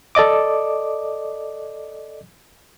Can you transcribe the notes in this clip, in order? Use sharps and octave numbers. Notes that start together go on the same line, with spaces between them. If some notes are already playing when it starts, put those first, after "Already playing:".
A4 D5 D#5 D6